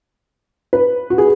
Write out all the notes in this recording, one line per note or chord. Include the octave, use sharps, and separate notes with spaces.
B4
F#4
G#4